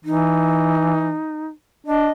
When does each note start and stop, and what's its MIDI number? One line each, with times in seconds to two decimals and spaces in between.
0.05 1.18 52
0.05 1.46 63
1.87 2.10 62
1.87 2.12 75